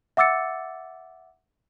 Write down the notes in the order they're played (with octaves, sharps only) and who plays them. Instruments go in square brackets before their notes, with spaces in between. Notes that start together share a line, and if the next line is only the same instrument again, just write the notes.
[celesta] E5 F#5 D6 E6 A6 C#7